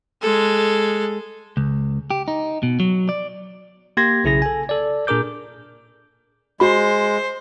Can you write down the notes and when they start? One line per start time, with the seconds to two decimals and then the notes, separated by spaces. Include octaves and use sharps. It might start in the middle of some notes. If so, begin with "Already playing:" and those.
0.22 G#3 A4
1.57 C#2
2.11 G4
2.28 D#4
2.63 B2
2.80 F#3
3.09 D5
3.97 A#3 G4 C6 G#6 A#6
4.24 B1 C#3 E4 G#4 A#6
4.42 A4 G#5
4.69 A4 D5
5.07 A#2 D4 G#4 A#4 D6 G6
6.60 G#3 F#4 C5 B5